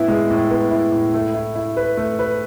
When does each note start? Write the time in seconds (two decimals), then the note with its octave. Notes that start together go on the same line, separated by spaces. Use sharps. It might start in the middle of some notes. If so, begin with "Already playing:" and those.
Already playing: A2 B3 E4
0.08 G#3
0.30 A2
0.50 B3
0.71 E4
0.92 A2
1.14 A3
1.34 E4
1.55 E4
1.77 B4
1.97 A3
2.19 B4